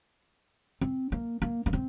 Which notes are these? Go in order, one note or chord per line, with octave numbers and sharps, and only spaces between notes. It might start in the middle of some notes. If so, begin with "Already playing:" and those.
C4
A#3
A#3
A#3
C4